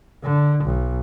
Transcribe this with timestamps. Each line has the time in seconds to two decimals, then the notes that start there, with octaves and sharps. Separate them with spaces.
0.24 D3
0.65 B1